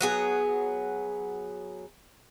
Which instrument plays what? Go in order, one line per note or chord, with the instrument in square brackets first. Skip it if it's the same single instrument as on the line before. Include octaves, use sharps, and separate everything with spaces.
[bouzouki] F#3 B3 G#4